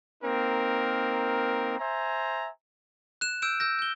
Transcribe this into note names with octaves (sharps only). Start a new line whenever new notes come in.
A#3 C4 D#4 A#4
C5 E5 G#5 A#5
F#6 E7
E6 G6 D7 E7
E6 G6 A#6
G6 G7